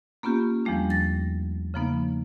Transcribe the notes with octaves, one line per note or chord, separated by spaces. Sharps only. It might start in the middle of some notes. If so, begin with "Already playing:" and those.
A#3 B3 C#4 F4 G4
E2 F3 G3 A3 D4
A6 A#6
C#3 F3 A#3 B3 D#4